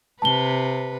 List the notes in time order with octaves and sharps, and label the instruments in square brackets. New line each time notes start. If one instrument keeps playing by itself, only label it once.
[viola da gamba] C3 B4 [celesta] A5 G7